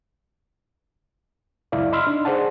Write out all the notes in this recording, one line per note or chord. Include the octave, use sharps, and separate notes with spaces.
C#2 F#2 E4 D5 F5
D#5 B5 C6 E6 F6
D4 D#4
G#4 C5 D5 F#5 A5